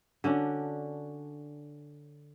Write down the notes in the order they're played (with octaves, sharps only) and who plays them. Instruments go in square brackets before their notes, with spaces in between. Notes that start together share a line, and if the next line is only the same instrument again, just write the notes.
[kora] D3 C#4 D4 F#4